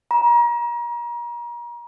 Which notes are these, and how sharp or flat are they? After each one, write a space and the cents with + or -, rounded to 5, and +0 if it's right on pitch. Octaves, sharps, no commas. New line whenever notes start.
A#5 +35